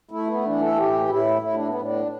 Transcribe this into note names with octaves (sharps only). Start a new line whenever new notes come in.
A3 E4
B3
E3 D4
A4
A2 G4
A2 E4
A2 E4
D4
B3
A2
D4